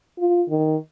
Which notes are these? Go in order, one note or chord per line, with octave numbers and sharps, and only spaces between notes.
F4
D#3